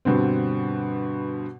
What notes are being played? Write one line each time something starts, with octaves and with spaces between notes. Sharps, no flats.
G2 B2 D3 C4